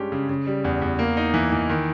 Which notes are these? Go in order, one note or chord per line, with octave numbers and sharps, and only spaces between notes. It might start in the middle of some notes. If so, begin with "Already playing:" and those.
Already playing: G2 G#3 C#4 G4
C#3
C#3
G3
E2
E2
A#3
D#4
E3
E3
D#3